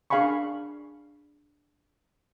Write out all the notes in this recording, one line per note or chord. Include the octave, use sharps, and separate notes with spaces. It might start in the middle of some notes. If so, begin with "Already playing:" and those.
D4 G#4 F5 G#5 B5 C#6